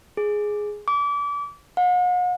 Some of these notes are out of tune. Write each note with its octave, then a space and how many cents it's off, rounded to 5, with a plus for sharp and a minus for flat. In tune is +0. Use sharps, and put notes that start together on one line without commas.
G#4 +5
D6 -30
F#5 -45